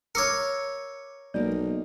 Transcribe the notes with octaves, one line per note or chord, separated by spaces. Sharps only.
A#4 C#5 D6 E6 C#7
B1 A#3 D5 D#5